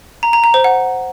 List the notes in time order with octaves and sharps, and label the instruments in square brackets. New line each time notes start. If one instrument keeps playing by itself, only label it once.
[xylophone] A#5
A#5
A#5
C5
F#5